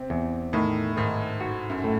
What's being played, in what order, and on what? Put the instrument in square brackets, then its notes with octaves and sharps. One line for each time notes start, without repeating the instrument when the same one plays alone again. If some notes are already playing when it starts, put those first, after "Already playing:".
Already playing: [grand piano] C3 [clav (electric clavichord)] C4
[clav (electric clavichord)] E2
[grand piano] A2 [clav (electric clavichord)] D#3
[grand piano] G#2 [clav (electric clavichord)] D#3
[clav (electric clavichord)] F#4
[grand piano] F#2
[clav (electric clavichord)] A2